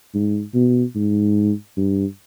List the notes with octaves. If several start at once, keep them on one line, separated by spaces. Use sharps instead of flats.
G#2
B2
G#2
G2